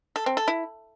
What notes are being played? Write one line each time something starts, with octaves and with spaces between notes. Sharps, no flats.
A4
C4
A4
E4